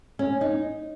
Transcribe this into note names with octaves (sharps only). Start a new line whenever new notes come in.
C#4
D#4